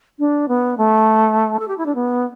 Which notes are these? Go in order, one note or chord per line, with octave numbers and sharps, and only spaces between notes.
D4
B3
A3
A4
G4
E4
D4
B3